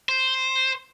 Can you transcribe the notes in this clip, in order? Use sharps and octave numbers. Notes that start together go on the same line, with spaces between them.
C5